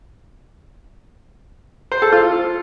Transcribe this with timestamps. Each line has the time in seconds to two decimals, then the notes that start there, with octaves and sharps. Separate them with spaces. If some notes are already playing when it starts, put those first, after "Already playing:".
1.92 C5
2.02 A4
2.12 F4